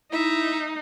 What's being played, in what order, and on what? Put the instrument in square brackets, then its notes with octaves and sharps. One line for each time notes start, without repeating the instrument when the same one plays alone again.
[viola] D#4 [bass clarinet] E4 [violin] E5